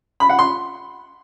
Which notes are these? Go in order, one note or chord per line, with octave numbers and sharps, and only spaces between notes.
B5
F#5
C6